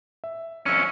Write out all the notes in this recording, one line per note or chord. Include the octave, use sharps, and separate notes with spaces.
E5
F2 C#4 C#6 E6 F6